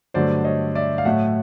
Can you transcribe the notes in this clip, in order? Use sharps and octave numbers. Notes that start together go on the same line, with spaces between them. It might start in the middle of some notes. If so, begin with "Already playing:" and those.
G2 D3 F#3 A3 C5 D5
C#5 D#5
D5 E5
F5
A2 F#3 A3 E5 F#5